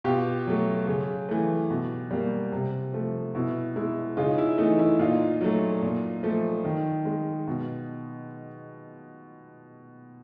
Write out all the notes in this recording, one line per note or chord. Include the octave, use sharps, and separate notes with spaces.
B2 F4 G4
F#3 A3
C#3
E3 A3
B2
G3 A#3
C3
F3 A3
B2 E4
G#3 E4
C#3 D#4 F4
E4
E3 A3 D#4
E4
A#2 D#4 F4
F#3 A3
A#2
F3 A3
D#3
G#3
B2